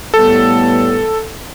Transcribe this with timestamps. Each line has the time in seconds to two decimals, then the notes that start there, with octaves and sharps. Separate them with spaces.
0.14 A2 G3 B3 A4